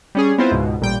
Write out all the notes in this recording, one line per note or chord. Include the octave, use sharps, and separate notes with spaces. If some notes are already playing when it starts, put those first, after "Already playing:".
G3 C#4 G#4
B3 C4 E4 F4 C5
C#2 G#2 B2
A1 A#2 G3 G5